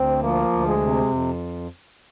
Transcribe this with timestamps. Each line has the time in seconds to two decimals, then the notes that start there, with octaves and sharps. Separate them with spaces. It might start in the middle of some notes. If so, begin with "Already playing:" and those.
Already playing: D2 C4
0.23 F3 A#3
0.52 D2
0.66 G#3
0.81 C3
1.10 F2